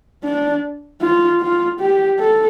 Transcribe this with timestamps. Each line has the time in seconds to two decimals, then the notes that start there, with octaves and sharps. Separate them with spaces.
0.24 D4
1.01 F4
1.41 F4
1.80 G4
2.20 A4